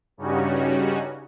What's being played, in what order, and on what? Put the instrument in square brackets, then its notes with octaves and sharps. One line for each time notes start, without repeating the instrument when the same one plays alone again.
[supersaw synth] G2 C#3 G3 C#4 D#4 F#4